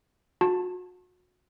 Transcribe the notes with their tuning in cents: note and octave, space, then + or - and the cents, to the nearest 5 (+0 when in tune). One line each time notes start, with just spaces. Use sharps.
F#4 -35 A5 +10